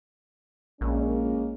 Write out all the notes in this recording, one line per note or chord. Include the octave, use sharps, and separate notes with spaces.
A#1 G#3 A#3 C#4